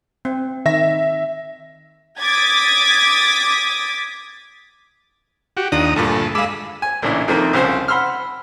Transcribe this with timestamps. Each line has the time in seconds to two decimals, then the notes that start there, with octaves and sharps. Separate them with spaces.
0.25 C4
0.66 D#3 E5 A#6
2.21 D6 D#6 G#6 A6 B6
5.57 F#4 G4
5.72 D#2 D4 F4 A#5 D#6
5.96 D2 G2 A#2 A4
6.35 G#3 F5 B5 D6 E6
6.82 G#5
7.02 A1 A#2 C#3 D4 E4
7.28 F2 D#3 A3 A#3
7.53 C2 C#3 F3 C5 F5
7.88 F#5 B5 C6 E6 F6